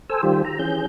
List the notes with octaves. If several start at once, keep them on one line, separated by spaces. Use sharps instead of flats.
A4 C5 G#5 E6
D#3 G3 F4 G4 C5
A#5
E3 C#4 G#4 G6